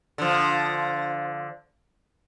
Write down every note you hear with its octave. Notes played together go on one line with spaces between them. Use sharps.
D3 F3